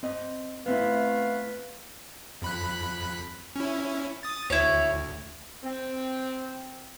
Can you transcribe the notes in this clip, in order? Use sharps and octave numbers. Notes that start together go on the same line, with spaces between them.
C4 D#5
A3 B3 C4 E4 B4 F5
F2 B5 F#6
C#4 E4
D#6 A6
D2 E4 C#5
C4